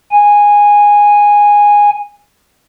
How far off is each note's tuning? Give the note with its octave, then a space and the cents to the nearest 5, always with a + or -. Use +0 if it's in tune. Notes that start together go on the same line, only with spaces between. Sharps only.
G#5 -10